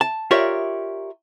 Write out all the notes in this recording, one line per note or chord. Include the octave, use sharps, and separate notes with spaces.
A5
F4 G4 A#4 C#5 D5 E5